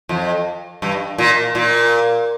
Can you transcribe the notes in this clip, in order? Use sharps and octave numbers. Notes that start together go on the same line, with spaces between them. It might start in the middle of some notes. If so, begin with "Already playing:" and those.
F2
G2
A#2
A#2